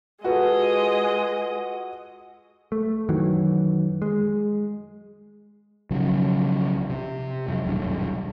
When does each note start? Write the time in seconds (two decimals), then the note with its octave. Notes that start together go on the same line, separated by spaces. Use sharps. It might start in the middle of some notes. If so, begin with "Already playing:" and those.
0.24 G#3 F4 F#4 A4 B4 D#5
2.72 A3
3.09 F#2 D#3 E3 F#3
4.02 G#3
5.91 B1 C#3 F3 F#3
6.90 C3
7.48 F2 F#3
7.64 D#1 B1 G2